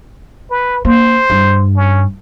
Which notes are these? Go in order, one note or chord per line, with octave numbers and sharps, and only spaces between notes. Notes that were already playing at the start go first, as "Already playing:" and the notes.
B4
A#3 C5
G2
C#4